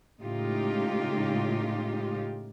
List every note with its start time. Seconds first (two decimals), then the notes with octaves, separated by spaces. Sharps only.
0.21 A2 C#3 G#3 D#4 F4 G4